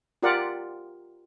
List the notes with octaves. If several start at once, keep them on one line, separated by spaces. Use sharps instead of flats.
F4 G4 A#4 D5 F#5